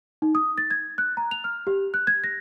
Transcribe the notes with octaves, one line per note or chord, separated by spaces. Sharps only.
D#4
D#6
A6
G#6
F#6
A#5
F7
F6
G4
F#6
G#6
A#6